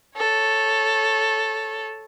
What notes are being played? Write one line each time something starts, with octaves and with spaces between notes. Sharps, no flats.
A4 C#5